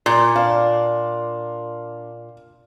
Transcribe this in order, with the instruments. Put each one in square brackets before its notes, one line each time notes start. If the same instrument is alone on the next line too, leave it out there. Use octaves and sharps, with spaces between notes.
[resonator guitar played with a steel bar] A#2
[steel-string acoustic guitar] D4 [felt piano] F5